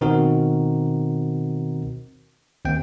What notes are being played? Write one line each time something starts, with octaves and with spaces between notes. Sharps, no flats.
B2 D#3 C4 D#4 F#4 A#4
D#2 C4 G5